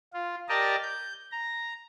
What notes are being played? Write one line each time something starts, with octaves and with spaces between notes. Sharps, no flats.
F4
G4 A#4 D5 D#5 A5 A#5
G6
A#5